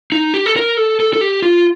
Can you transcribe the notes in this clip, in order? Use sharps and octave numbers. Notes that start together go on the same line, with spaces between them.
D#4
G4
A4
A#4
A4
A4
A4
G4
F4